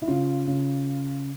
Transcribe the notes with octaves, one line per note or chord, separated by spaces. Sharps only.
E4
C#3 F4
C#3